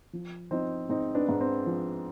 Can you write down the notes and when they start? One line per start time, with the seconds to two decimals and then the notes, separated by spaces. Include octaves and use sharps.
0.13 F3
0.51 F3 C4 D#4
0.89 G#2 C4 D#4
1.15 B3 D4
1.29 G#2
1.41 C4
1.66 F3